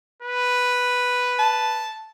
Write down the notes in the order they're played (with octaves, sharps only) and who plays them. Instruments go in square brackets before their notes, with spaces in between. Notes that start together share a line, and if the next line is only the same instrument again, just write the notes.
[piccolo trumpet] B4
[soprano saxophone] A5